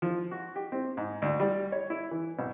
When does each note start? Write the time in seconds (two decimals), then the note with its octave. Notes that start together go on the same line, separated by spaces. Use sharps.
0.02 F3
0.31 F#4
0.56 G4
0.72 C4
0.97 G#2
1.22 D2
1.40 G3
1.72 C#5
1.90 E4
2.11 E3
2.39 B1